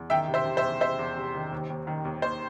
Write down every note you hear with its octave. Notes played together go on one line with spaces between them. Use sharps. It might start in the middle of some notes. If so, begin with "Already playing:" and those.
Already playing: E2
D#3 E5 G5
C3
C5 E5
C3
C5 E5
E2
C3 C5 E5
E2
C3
D#3
D#2
D#2
D#3
D#2
D#2 C5